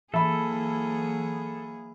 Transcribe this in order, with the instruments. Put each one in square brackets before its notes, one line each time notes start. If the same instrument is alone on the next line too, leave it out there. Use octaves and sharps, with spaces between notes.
[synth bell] E3 [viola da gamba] F#3 A#3 G#4 [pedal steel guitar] A4 [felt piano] E5 B5